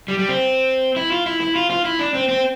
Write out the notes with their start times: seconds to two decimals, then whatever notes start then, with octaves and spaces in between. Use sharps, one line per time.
0.08 G3
0.19 G3
0.28 C4
0.96 E4
1.12 F4
1.26 E4
1.41 E4
1.56 F4
1.70 F4
1.85 E4
1.99 D4
2.14 C4
2.29 C4